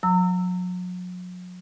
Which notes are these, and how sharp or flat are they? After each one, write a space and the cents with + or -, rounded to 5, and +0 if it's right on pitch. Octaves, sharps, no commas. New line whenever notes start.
F#3 -40 A#5 -35 E6 +0